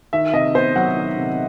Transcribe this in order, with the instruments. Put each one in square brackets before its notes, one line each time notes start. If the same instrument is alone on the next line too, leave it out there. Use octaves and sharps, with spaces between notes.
[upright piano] D#3 E5
C3 D#5
B3 C5
F#3 F#5
D#3
C3